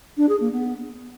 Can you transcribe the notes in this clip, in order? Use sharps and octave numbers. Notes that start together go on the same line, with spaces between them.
D4
G#4
A#3
B3